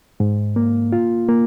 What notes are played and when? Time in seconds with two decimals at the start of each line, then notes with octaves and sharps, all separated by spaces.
0.20 G#2
0.56 A#3
0.92 F4
1.29 A#3